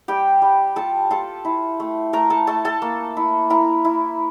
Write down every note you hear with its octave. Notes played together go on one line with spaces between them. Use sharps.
G3 G4 G5
G3
F4 A4 A5
F4 A4 A5
E4
A3
A3 A#4 A#5
A4 A5
A3 A4 A5
A4 A5
A#3
E4
E4 A#4 A#5
E4